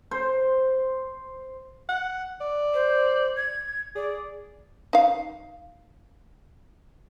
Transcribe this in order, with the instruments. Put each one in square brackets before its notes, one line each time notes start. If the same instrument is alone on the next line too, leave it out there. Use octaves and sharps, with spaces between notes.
[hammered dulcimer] C5
[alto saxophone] F#5
D5
[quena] C5
G#6
[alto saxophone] G#4 [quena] D5
[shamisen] D#4 F5